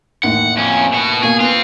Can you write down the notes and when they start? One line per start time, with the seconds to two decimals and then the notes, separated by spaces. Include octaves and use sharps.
0.23 A1 D#2 A2 F#5
0.57 F2 C#4
0.92 B2 F#4
1.23 B2 A#3 G#4
1.40 B3 C4 F4